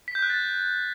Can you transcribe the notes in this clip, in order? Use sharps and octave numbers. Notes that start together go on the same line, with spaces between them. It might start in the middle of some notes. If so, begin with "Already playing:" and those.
B6
G6
F#6
A6